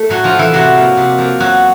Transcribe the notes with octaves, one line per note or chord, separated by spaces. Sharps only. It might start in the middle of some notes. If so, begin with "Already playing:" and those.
Already playing: A3
A2 F#3 F#4
F3 F4
F#3 A3
E3 E4
C3 F#3 F#4
F3 A#3
C3
F3 A#3
E2 F#3 F#4